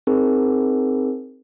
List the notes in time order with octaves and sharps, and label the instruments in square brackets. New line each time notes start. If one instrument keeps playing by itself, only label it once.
[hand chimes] C4 D#4 G#4 A#4